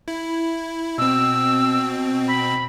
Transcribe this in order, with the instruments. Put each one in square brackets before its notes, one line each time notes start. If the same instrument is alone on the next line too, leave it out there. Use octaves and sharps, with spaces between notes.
[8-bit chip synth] E4
[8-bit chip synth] B2 C4 [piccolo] E6
[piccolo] B5